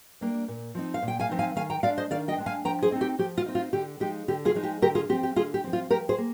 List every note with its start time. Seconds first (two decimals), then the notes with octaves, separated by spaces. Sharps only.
0.21 G3 A#3 D4
0.48 A#2
0.75 F3 C4 D#4
0.94 F5
1.02 A#2
1.08 G5
1.20 F5 G#5
1.29 F3 C4 D#4
1.39 F5 G#5
1.56 D#3 F5 G#5
1.70 G5 A#5
1.83 G#3 D5 F5
1.86 D4
1.98 C5 D#5
2.11 D#3 D5 F5
2.28 D#5 G5
2.38 G#3 D4
2.46 F5 G#5
2.65 F3 G5 A#5
2.82 G#4 C5
2.92 C4 D#4
3.01 G4
3.19 F3 G4
3.37 F4
3.46 C4 D#4
3.55 F4
3.73 D3 G4
4.00 F3 G#3 D#4 G4
4.28 D3 G4
4.45 F4 G#4
4.55 F3 G#3 D#4
4.63 G4
4.82 D3 G4 A#4
4.95 F4 G#4
5.09 F3 C4 G4
5.23 G4
5.36 D3 F4 G#4
5.54 G4
5.64 F3 C4
5.73 F4
5.90 F3 G4 A#4
6.09 G#4 C5
6.18 A#3